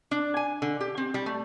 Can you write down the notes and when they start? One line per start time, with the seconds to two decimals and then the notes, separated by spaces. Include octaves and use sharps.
0.11 D4
0.37 G#5
0.62 D3
0.81 G4
0.97 C4
1.14 G3
1.26 A3